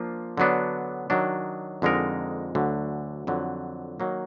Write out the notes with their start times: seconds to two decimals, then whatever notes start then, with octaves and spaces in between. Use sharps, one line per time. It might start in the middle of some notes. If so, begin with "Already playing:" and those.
Already playing: F3 A#3 D4 F4
0.37 D3 F#3 B3 D4
1.10 D#3 F#3 D4
1.82 F2 D3 G#3 D#4 A#4
2.55 D2 D3 F#3
3.27 F2 D3 F#3
4.00 D#3 F#3 A#3